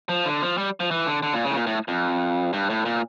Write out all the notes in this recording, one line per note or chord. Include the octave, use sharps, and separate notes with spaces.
F3
D3
F3
G3
F3
E3
D3
D3
A#2
C#3
A2
A#2
A2
F2
G2
A2
A#2